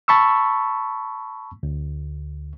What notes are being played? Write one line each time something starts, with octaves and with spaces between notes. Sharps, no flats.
A5 B5 C#6 E6
D2